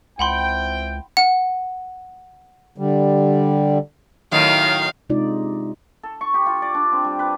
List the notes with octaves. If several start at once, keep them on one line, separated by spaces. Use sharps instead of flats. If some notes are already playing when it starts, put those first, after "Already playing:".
C#2 C4 E4 F#5 G5 B5 C6
F#5
D3 G3
A2 D#3 F#3 F5
C3 G#3 D4 D#4 F4 D5
A4
C#6
G4
F4
D5
D4
C4
G3
B4